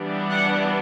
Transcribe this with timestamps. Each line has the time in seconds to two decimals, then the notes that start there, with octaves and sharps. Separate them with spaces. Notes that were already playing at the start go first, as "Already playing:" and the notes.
Already playing: E3 G3 B3 D4
0.30 F#5